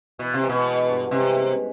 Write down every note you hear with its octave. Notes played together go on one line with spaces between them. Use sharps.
B2 E3
C3
G#3
B2
B3
G2
C3 G#3
C#4